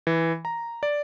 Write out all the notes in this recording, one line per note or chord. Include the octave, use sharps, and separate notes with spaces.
E3
A#5
D5